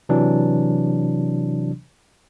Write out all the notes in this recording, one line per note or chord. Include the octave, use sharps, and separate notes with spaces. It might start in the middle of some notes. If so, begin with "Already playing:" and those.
C3 E3 F#3 D4